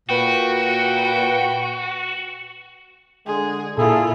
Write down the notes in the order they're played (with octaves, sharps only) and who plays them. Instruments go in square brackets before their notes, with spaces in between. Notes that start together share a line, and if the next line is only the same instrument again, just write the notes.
[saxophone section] A#2 B4 [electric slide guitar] F#4 [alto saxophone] G5
[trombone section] D3 G#3 [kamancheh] G#4
[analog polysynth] A#2 [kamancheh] E4 F4 [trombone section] G#4 A4